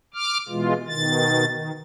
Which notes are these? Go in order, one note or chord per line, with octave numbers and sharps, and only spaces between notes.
D6 F6
B2 E3 G#3 F4
B2 D#3 A6
D#3